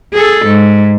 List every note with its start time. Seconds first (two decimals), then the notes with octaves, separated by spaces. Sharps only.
0.13 G#4 A4
0.46 G#2